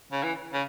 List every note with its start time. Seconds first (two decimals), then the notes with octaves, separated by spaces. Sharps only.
0.12 C#3
0.23 E3
0.53 C#3